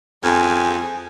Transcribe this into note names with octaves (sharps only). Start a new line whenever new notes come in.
F2 G#4 G#5